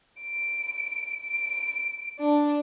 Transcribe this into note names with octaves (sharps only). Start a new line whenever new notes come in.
D7
D7
D4